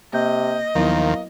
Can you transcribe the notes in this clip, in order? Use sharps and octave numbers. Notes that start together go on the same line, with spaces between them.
C3 A#3 D#5 G6
D#2 D#3 F3 F#3 A#3 B3 E4